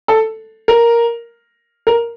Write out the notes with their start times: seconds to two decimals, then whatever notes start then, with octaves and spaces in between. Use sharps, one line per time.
0.08 A4
0.68 A#4
1.87 A#4